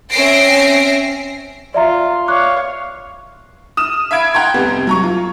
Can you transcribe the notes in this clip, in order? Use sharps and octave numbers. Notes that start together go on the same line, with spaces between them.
C4 C#4 E5 A#6 C7 D7
F4 D5 E5 A#5
C#5 F5 D6 F#6
D#6 F6 E7
E5 F5 B5 G#6 D7
F#5 G5 A#5 C6 G#6
F1 C2 B3
F#3 A#5 C#6
F4